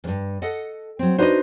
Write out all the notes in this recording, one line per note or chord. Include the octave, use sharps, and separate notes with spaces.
E2 G2
A4 D#5 F#5
F#3 C4
D4 D#4 F#4 B4 C5 D#5